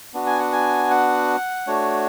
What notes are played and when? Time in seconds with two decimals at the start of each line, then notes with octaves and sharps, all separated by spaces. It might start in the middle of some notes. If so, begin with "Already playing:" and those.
0.14 B3 D4 F#4
0.26 G#5
0.40 F#5
0.52 G#5
0.90 F#5
1.67 A3 D4 F#4 C#5